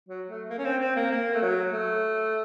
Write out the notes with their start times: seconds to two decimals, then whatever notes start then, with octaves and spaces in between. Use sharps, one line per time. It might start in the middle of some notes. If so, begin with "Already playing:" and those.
0.09 F#3
0.29 A3
0.50 A#3
0.58 C#4
0.65 C4
0.81 C4
0.96 A#3
1.12 A#3
1.34 A3
1.42 F#3
1.73 A3